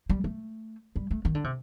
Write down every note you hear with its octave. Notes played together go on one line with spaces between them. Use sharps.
G3
A3
G3
A3
D#3
D3
C3